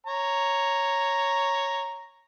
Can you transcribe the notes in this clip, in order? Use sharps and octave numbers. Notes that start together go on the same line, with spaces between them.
C#5 A#5